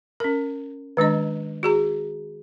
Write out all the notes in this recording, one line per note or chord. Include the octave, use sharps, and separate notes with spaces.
C#4 A#4
D#3 G#3 D4 D#5
F#4 G#4 A#5